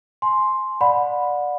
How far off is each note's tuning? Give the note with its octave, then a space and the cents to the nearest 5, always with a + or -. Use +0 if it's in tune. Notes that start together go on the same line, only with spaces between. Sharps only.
G#5 +30 C6 +5
D5 +0 F#5 -30 B5 +0